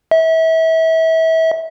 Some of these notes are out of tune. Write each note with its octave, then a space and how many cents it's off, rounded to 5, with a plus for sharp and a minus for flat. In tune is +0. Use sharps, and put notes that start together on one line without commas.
E5 -30